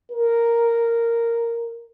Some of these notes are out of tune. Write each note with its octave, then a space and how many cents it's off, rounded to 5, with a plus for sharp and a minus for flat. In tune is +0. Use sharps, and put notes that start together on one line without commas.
A#4 -5